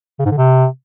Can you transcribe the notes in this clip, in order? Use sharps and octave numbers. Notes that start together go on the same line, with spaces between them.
C#3
G#2
D3
C3